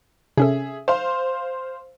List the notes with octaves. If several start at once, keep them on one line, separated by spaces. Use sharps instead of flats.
C3 C#4 G#4 A4 E5
C5 F5 C6